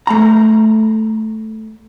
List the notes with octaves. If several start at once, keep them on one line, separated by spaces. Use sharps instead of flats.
A3 A#5